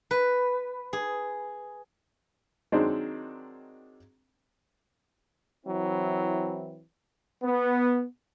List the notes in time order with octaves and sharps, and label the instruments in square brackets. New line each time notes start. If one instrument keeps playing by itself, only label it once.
[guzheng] B4
G#4
[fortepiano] D#3 F#3 G#3 C4 D4 D#4
[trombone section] E3 F#3 C4 E4
B3